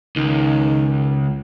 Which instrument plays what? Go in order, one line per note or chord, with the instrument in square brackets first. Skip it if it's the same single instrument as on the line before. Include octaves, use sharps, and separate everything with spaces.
[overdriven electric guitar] C#2 [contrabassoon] D#3